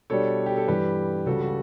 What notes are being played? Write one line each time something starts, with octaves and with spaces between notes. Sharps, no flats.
B2 G3 D4 A4 C#5
G4
A4
G2 E3 G3 G4 B4
C#2 C#3 G3 F#4 A4
F#4